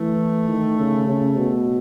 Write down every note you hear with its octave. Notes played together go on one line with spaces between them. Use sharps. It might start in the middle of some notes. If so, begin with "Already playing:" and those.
Already playing: E3 A3
D#3
C#3
C#3
B2